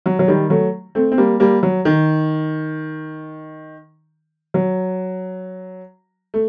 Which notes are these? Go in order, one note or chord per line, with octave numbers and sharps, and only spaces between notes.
F#3
F#3
D#3 G3
F#3 A3
A3 C4
C4
G3 A#3
G3 A#3
F#3
D#3
F#3
A3